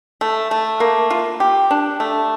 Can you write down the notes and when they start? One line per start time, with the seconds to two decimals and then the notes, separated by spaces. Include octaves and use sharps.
0.21 A3
0.51 A3
0.80 A#3
1.10 F4
1.40 G4
1.71 D4
2.00 A3